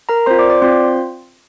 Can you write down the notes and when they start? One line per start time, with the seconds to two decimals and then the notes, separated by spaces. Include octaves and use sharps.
0.09 A#4 A#5
0.26 C4 F4 C5 C6
0.39 D5 D6
0.49 D5 D6
0.61 C4 F4 C5 C6